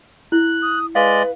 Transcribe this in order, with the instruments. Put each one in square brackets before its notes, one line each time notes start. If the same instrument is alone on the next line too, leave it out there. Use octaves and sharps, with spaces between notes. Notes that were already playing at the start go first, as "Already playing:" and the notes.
[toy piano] E4 [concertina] F#6
[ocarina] D#6
[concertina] G#3 D5 D#5 [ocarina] B4 [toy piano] F5